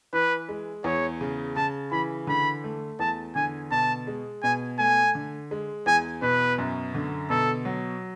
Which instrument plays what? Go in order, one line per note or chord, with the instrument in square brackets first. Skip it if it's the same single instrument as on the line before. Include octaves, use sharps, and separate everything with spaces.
[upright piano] E3 [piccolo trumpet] B4
[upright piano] G#3
[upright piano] E2 [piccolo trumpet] C#5
[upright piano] C#3
[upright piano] C#3 [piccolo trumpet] A5
[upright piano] E3 [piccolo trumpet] B5
[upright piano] D3 [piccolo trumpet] B5
[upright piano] A3
[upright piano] E2 [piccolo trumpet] A5
[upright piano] D3 [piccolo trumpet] G#5
[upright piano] B2 [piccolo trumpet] A5
[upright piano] G#3
[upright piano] B2 [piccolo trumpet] G#5
[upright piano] A3 [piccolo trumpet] G#5
[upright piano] D3
G#3
[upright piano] E2 [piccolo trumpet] G#5
[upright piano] B2 [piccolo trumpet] B4
[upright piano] F#2
D3
[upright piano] B2 [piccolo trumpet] A4
[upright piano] F#3